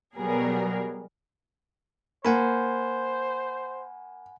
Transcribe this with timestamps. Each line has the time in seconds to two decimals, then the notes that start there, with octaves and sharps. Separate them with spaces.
0.16 B2 F#3 G3 B3 G#4 A#4
2.25 A#3 C5 F#5 G#5 B5